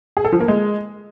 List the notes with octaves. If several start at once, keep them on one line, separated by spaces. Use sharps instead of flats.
G#4
A4
F3
A#3
G#3